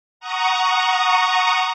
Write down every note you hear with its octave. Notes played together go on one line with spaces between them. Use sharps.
F#5 A#5 C#6 D#6